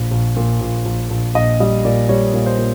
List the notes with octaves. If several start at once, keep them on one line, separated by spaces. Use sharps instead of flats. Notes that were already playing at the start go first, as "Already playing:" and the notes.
Already playing: A#1
A#1
A#2
A#1
A#1
A#1
A#1 D#5
G3 D#5
A#2 D5
G3 C#5
A#2
C5
A#2